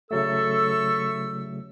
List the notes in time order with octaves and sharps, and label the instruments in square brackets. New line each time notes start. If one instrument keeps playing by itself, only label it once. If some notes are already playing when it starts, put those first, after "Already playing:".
[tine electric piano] C#3 F#3 A3 [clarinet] A4 [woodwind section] E5 C#6 E6